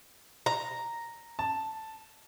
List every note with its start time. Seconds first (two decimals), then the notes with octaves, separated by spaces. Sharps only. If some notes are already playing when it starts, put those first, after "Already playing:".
0.46 A#5
1.39 A5